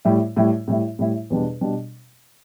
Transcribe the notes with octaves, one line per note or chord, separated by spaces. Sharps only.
A2 G3 E4
A2 G3 E4
A2 G3 E4
A2 G3 E4
E2 B2 G3 D4
B2 G3 D4